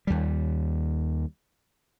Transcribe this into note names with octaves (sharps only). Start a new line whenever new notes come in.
D#2 G3